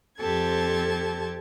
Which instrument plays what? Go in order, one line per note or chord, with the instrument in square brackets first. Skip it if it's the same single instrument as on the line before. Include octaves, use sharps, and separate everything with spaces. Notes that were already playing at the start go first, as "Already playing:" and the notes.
[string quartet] F2 C4 G4 A4 A5 G#6